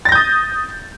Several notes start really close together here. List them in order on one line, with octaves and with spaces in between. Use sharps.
A6 A#6 G6 D#6